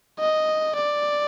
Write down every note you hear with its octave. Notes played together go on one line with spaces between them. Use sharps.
D#5
D5